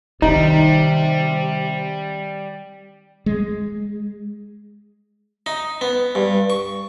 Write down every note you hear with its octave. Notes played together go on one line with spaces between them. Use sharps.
C3 D#3 G3 D#4
G#3
D#4
B3
G2
C#6